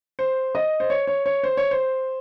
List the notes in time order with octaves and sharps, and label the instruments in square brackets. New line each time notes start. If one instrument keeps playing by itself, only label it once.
[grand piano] C5
D#5
C5
C#5
C#5
C#5
C5
C#5
C5